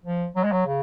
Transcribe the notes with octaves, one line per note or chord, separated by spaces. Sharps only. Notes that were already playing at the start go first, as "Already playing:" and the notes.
F3
F#3
G#3
F#3
C#3